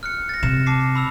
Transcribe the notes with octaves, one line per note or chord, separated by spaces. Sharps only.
F6 F#6 C#7
A6 A#6
C3 E7
A5 D6 C7
B5 E6 F7